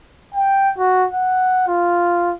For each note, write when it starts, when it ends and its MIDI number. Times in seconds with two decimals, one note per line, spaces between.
0.34 0.70 79
0.78 1.06 66
1.12 1.65 78
1.67 2.33 65